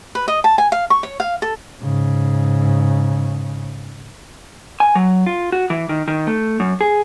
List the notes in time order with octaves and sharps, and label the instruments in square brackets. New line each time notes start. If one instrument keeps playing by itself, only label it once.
[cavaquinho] B4
D#5
A5
G#5
F5
C#6
C#5
F5
A4
[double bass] G#2 C#3
[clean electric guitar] G#5
F#3
F4
F#4
E3
D#3
D#3
A3
F#2
G#4